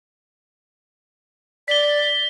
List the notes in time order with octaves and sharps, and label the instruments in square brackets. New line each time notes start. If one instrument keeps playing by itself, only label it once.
[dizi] D5 [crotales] B6 G7